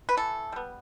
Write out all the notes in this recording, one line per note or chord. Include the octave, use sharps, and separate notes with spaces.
B4
E3 A4
G3 B3